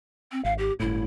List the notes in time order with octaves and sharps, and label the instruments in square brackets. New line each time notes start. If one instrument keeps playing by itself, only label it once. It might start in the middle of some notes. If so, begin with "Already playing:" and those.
[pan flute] C4
[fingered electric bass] G#1 [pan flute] F5
[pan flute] G4
[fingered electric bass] G1 A2 [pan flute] E4